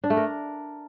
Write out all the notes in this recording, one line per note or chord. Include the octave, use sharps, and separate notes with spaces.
D4
A3
A#4